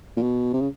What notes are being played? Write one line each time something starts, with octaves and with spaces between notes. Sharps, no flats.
A#2
B2
C3
C#3